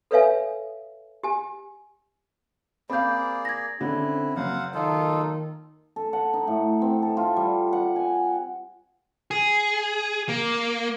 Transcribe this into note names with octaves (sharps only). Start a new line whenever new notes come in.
A4 B4 C#5 E5 F5 G#5
G4 G#5
A#3 C4 G#4 D5 F5 B5 G6
G#6 A#6
D3 C4 C#4 E4
F#1 C5 F5 F#5
D#3 D#4 F4 A4
A4
F#5
D#4
A2
C4
A4
F4
G3
F#5
G#5
G#4
A#3